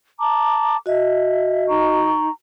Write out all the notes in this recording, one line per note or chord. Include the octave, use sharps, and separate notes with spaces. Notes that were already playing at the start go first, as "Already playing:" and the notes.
A5 A#5 D6
F#4 D#5 E5
D#4 A#5 C#6